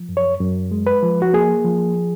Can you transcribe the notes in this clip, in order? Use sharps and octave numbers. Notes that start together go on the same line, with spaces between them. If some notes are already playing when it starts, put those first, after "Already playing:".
Already playing: F3
F#2
C#5
F#2
G#3
B4
F3
F#4
A#3 G#4
F3